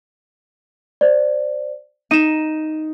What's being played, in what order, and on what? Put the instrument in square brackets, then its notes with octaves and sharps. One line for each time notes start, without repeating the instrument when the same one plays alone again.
[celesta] C5 D5
[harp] D#4 [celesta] D#7 E7